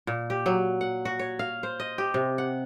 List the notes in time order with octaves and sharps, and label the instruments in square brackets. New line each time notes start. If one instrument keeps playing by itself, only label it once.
[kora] A#2
G4
F#3
F#5
F#4
C#5
F5
C5
D#5
G4
C3
F#5